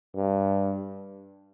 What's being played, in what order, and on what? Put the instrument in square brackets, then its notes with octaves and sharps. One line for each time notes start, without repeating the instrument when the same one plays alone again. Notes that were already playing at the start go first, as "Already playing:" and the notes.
[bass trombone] G2